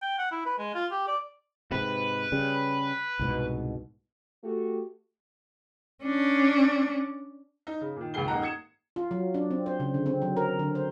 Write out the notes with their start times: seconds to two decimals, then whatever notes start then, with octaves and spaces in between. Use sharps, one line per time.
0.02 G5
0.18 F#5
0.32 E4
0.45 B4
0.58 G#3
0.74 F4
0.91 G4
1.08 D5
1.72 G#2 C3 B4
2.32 C#3 G3
3.19 C2 G#2 B2
4.43 A3 F#4 G4
6.04 C#4 D4
7.67 D#4
7.81 C#3
7.96 A#2 D#3
8.14 C#2 A#2 D#3 G#4 C7 G7
8.28 D#1 G#2 A#3 D#4 F#5 A#5
8.42 D#6 G#6 C#7 E7
8.96 F4
9.11 F#3
9.34 D4
9.51 C4
9.66 C5
9.80 C#3
9.94 D3
10.06 C4
10.22 F#3
10.37 A#4
10.59 D3
10.75 C5